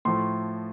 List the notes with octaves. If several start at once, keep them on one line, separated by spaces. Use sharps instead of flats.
A2 F3 A3 C6